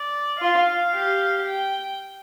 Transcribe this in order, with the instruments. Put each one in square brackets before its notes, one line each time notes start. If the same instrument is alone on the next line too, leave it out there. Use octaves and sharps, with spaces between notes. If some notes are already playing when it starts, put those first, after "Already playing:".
Already playing: [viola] D5
[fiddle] F4 [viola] F5
[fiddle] G4
[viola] G5